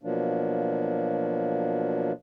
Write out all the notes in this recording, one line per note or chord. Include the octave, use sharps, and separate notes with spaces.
B2 F3 F#3 A#3 D4